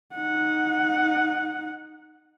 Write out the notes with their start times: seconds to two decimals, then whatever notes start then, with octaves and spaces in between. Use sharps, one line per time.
0.15 D#4 F#5